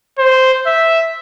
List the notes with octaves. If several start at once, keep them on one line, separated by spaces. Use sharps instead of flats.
C5
E5